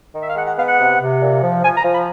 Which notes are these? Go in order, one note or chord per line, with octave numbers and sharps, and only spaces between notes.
D#3
E5
F5
G#3 F#5
F#5
B3 F5
F#5
C3
C3
A#2
F3
F3 G#5
A#5
F3
B5